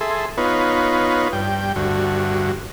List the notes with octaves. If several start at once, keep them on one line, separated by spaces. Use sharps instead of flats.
G#4 A4 E5 C6
B3 D#4 F4 B4 C#5
G2 G5
D2 G2 F#4